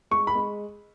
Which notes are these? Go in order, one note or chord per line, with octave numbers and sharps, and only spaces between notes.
G#3 C#6
B5
G#3